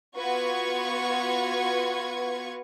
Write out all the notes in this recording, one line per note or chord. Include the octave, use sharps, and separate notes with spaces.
B3 F4 F#4 B4 C#6 G#6